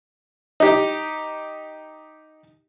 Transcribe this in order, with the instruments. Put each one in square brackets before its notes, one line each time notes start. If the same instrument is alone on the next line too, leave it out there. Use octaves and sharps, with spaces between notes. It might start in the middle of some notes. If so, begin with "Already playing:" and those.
[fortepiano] D#4 G4